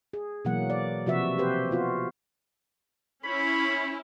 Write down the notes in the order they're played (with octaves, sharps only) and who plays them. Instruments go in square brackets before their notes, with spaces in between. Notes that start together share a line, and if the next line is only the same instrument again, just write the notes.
[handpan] G#4
B2 E3 F#3 A#3 F#5
D5
C3 F3 F#4 B4 E5
C4 G4 B4 C5
B3 F4 F#4
[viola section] C#4 E4 [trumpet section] C5 C#5 B5